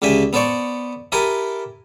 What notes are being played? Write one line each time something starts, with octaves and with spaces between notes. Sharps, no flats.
C#2 D3 G4 E5 G#5
B3 A4 C5 D5 C#6
E4 G4 A4 A#4 G#5